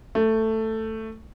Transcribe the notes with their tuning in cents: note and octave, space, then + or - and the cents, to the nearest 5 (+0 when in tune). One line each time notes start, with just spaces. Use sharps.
A3 +10